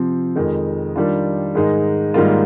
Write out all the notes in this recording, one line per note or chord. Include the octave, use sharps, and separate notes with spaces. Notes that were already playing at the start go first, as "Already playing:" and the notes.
Already playing: C3 F3 C4
F2 D#3 G#3
D#3 G3 D4 F4
G#2 D#3 G#3 D#4
G#2 D#3 G3 A#3 F4